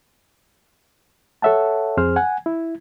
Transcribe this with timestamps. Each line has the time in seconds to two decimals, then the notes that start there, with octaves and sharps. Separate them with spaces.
1.42 A4 C#5 E5 F#5 A5
1.97 F2 C4 G#4 C5 F6
2.16 F#5 G#5
2.46 E4